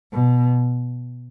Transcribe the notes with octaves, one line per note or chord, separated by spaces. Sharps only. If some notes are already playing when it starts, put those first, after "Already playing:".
B2